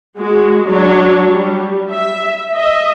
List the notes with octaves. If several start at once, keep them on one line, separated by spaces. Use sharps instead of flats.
G#3 F#4
F#3 D4 C#5
G3
E5
D#5 E5